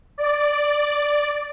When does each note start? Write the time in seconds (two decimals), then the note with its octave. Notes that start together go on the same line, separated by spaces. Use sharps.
0.18 D5